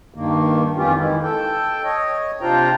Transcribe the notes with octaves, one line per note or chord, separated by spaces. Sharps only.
G2 D#3 A#3
F2 D#3 E3 C#4 F4 G4
D#3 E3 G#3 E4
A4 G5
C#5 D#5
C3 D4 F4 C5 G5 A#5